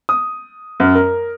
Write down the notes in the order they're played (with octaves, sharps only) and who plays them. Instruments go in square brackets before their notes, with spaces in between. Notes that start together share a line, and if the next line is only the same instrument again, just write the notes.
[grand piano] D#6
F#2
A#4